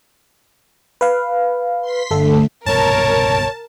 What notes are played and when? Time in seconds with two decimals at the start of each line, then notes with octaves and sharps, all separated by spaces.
1.01 B4 F5
1.81 C6 B6
2.11 G1 D3 A3 A4
2.66 G1 C2 B2 A#4 C#5 A5